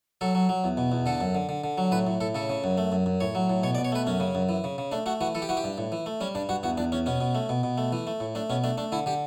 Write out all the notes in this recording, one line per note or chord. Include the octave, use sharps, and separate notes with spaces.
F#3 A4
F#3
F#3
E2
B2
E2
D3 A4
F#2
D3
D3
D3
F#3
A2 B4
A2
A2 A4
C#3 A4
C#3
F#2
A3
F#2
F#2
A2 C#5
F#3
A2
B2 C#5
D5
B2
C#5
A3 B4
F#2 C#4
C#3
F#2
E3
C#3
C#3
A3 D4
A3 F#4
E3 F#4
E3 A4
G4
E3 F#4
G4
G2
A2
E3
A3
G3 C#4
G2 D4
G2 F#4
E2 F#4
E2 D4
E2 C#4
B2 C#4
B2
A3
B2
B2
A3
E3
A3
A2
A3 D4
B2 C#4
A3 D4
A3 D4
D3 E4
D3 G4